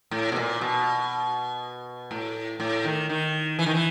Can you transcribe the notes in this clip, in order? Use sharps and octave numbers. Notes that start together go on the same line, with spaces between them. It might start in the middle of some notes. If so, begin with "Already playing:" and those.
A2
B2
A#2
B2
A2
A2
D#3
D#3
E3
D#3
E3